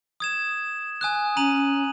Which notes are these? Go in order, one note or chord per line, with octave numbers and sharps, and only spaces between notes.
D#6 G#6 E7
G#5 D#6 F#6
C#4 A#5 D#7 F#7